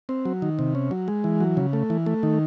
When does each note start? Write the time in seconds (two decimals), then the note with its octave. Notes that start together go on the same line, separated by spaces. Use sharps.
0.09 C4
0.25 F#3
0.42 D#3
0.59 C3
0.75 C#4
0.91 F#3
1.08 G#3
1.24 E3
1.40 F#3
1.57 C#3
1.73 A3
1.90 E3
2.06 A3
2.23 D#3